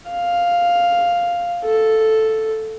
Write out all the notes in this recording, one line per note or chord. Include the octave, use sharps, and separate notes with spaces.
F5
A4